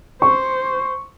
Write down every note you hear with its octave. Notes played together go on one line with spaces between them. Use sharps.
C5 C#6